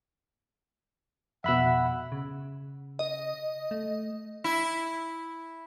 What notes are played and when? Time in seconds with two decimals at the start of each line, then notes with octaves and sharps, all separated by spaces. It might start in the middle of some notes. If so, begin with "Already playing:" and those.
1.44 F2 B2 E5 F#5 B5 E6
2.12 C#3
2.99 D#5
3.71 A3
4.44 E4